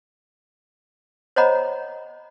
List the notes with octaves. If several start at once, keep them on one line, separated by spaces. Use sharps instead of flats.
C5 C#5 D#5 F#5 A#5 B5